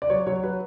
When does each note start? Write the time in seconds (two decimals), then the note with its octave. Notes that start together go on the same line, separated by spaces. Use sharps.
0.02 D5
0.10 F#3 C#5
0.27 F#3 C#5
0.43 F#3 B4